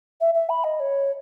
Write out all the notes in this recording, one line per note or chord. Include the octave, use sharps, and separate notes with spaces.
E5
E5
B5
D#5
C#5